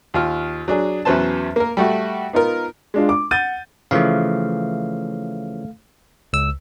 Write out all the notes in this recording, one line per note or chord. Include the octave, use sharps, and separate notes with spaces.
D#2 F4 F6
F#3 D4 G#4
E2 F#3 C#4 B4 C5 A5
A#3 A#4
G3 A3 F#4
B3 D#4 F4 A#4
G#3 D4 F4
D6
F#5 G6 A6 D#7
C#3 E3 F3 A3 F5
C#2 E6